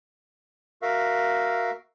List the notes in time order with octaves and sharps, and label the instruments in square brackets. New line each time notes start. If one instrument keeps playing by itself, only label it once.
[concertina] F#4 A#4 E5 F5